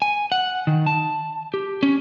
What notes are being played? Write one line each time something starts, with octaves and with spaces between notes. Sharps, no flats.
G#5
F#5
D#3
A5
G4
C#4